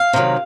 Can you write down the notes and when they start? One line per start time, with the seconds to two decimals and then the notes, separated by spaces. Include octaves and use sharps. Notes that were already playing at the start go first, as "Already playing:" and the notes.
Already playing: F5
0.13 C3 D#3 F#3